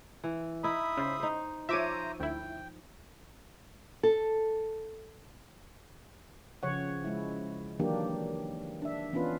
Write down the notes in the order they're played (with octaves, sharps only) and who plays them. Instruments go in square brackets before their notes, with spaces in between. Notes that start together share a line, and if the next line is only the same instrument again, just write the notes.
[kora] E3
[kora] D#4 E4 [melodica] E5 B5 D#6
[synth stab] C#3 [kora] C5
[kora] D#4 C5
[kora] F3 C#5 [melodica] C5 A#5 [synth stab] E5 D6 D#7
[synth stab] D2 E4 [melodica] G5
[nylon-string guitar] A4
[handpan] C#3 F3 C#5 F#5
G#3 E4
D#3 E3 F#3 A#3 D4 G4
D4 E5
E3 B3 C#4 D4 F4 B4